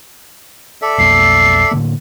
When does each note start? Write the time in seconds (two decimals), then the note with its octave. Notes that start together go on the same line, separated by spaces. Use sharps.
0.82 A4 D5 E5
0.98 B1 F2 A#3 C7
1.71 A2 D3 A#3